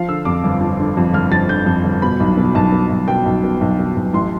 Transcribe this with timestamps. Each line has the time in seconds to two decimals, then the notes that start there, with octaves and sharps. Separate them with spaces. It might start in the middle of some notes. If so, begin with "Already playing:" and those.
Already playing: F3 F5
0.09 D3 E6
0.25 F2 D6
0.44 G1
0.61 F3
0.79 D3
0.97 F2
1.14 G1 F6
1.32 F3 A6
1.49 D3 G6
1.66 F2
1.84 G1
2.02 B2 B5
2.20 B1
2.37 B2
2.55 B1 A5
2.72 B2
2.90 B1
3.08 B2 G5
3.26 B1
3.44 B2
3.61 B1
3.79 B2
3.96 B1
4.13 A1 C6